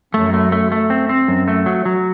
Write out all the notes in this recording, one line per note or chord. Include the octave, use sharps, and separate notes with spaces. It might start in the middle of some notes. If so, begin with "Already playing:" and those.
F#2 A3
A3
A3
A3
C4
C4
F#2
A3
F#3
F#3